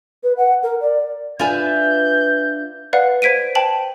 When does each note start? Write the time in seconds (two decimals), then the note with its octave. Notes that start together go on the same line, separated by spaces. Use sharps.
0.23 B4
0.37 F#5
0.63 A#4
0.81 D5
1.40 D4 F4 B4 E5 G#5 G6
2.93 B4 D5 F5 F#5
3.22 C5 G#6 B6 D7 D#7
3.55 C5 G5 A5 F#7